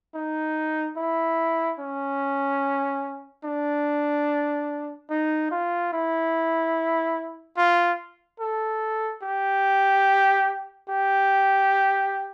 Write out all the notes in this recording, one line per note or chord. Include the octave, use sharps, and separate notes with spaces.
D#4
E4
C#4
D4
D#4
F4
E4
F4
A4
G4
G4